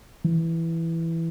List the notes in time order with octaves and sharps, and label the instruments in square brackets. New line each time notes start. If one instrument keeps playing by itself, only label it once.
[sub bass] E3